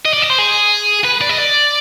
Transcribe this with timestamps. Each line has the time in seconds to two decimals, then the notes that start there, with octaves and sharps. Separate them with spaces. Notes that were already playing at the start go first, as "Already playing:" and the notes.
0.05 D#5
0.14 D5
0.22 D#5
0.30 C5
0.39 G#4
1.04 B4
1.21 D5
1.29 D#5
1.38 D5